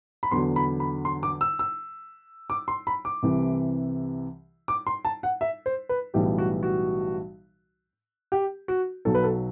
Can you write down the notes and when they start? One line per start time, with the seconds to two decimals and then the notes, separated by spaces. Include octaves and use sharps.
0.23 B5
0.31 E2 D3 F#3 C6
0.56 B5
0.80 B5
1.05 C6
1.23 D6
1.41 E6
1.59 E6
2.50 D6
2.68 C6
2.87 B5
3.05 D6
3.23 C2 C3 E3
4.68 D6
4.87 C6
5.05 A5
5.23 F#5
5.41 E5
5.66 C5
5.89 B4
6.14 B1 A2 E3 G3 G4
6.38 F#4
6.63 F#4
8.32 G4
8.68 F#4
9.05 B1 B2 F#3 A4
9.15 B4
9.24 A4